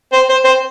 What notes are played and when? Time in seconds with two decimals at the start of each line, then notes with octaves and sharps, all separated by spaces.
0.13 C5
0.29 C5
0.44 C5